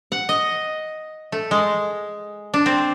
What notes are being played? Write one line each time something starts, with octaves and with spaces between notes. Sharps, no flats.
F#5
D#5
A3
G#3
D4
C4